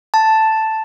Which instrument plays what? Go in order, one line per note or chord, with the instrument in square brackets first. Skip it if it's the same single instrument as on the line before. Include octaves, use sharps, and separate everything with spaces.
[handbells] A5